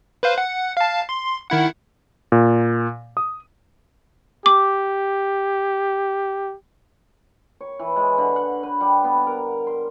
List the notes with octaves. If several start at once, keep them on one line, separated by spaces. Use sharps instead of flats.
B4 C5 F5
F#5
F5 A5
C6
D#3 E4 F#5
A#2
D#6
G4 D6
C#5
E3
G#3
D3
F#5
B4
G3
B3
A#4
C6